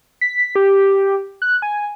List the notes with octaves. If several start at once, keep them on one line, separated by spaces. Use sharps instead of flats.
B6
G4
F#6
G#5